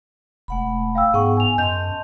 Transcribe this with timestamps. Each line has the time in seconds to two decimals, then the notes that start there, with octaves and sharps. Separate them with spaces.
0.48 E1 A3 F#5 B5
0.95 F5 G5 E6
1.14 G#2 B3 G#4 F#5 G5 C#6
1.37 G#5 F7
1.58 F#2 D#5 A5 C6 G6 F7